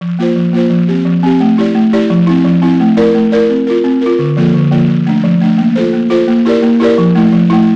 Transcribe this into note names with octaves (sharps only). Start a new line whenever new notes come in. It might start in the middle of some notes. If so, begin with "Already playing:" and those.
F3
A#3 F4 C5
F3
A#3 F4 C5
F3
C4 G4
F3
C4 G4
A3
E4 G4 D5
A3
E4 G4 D5
F3
C4 E4
F3
C4 E4
A3
E4 A#4 D5
A3
E4 A#4 D5
C4
F4 A#4
C4
F4 A#4
D3
F3 A#3 F4 A4
D3
F3 A#3 F4 A4
F3
A3 D4
F3
A3 D4
A#3
F4 A4 C5
A#3
F4 A4 C5
A#3
E4 G4 A#4 D5
A#3
E4 G4 A#4 D5
F3
A3 E4
F3
A3 E4